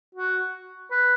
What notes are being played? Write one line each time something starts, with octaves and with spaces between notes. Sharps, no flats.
F#4
B4